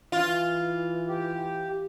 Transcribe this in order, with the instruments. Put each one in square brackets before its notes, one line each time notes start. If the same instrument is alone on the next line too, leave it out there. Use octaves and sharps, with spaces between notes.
[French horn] E3 [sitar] F4
[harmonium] G4